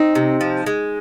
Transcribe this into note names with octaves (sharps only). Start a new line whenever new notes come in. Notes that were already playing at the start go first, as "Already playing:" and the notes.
Already playing: C4 D#4
C3
F3
G#3